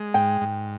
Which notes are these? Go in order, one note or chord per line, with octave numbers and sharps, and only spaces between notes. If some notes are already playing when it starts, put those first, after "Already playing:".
Already playing: G#3
G#2 G5
G#2